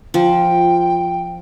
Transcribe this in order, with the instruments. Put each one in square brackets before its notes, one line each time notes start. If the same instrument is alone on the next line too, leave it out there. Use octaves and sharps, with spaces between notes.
[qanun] F3 [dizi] G5